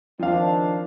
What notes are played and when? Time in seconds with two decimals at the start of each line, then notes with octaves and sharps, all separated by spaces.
0.19 D#3 F3 C4 D4 F5